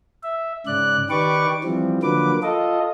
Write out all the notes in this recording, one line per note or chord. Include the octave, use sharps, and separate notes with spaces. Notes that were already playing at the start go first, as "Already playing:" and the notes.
E5
G#2 C#3 D5 F#6
D#3 G4 B4 D5 C#6 D6
E3 F3 G3 C4
D3 F3 F#3 A#3 B4 D6
F4 A4 D#5